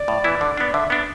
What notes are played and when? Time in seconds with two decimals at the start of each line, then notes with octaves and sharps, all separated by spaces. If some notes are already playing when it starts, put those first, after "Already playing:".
Already playing: D5
0.08 A2
0.24 E3 B3 E4
0.41 D3
0.57 B3 D4
0.74 D3 E5
0.90 B3 D4